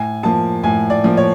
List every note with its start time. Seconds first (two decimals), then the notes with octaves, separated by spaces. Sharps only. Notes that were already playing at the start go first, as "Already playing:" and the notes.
Already playing: A2 G#5
0.23 F3 A#3 A5
0.63 A2 G#5
0.90 D5
1.04 F3 A#3
1.17 C#5